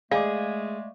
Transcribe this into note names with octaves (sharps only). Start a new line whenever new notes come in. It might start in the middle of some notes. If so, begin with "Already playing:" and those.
G#3 A3 G#4 D5 D#5 F5 D6